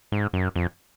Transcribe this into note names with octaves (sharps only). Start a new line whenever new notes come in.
G#2
F#2
F2